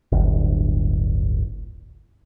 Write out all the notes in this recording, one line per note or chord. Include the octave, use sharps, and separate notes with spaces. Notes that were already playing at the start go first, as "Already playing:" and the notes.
D1 G1